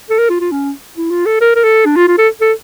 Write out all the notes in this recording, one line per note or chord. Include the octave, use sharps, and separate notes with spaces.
A4
A#4
F4
F4
C#4
E4
F4
A4
A#4
A#4
A4
D4
F4
F4
A4
A4